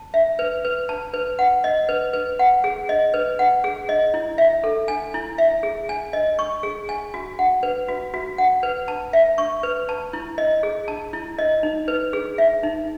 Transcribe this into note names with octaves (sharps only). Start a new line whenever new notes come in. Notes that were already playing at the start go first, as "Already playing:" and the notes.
Already playing: A5
E5
B4
B4
A5
B4
F#5
D#5
B4
B4
F#5
G#4
D#5
B4
F#5
G#4
D#5
E4
E5
A4
G#5
E4
E5
G#4
G#5
D#5
C#6
G#4
G#5
F#4
F#5
B4
F#4
F#4
F#5
B4
A5
E5
C#6
B4
A5
E4
D#5
G#4
A5
E4
D#5
D#4
B4
G#4
E5
D#4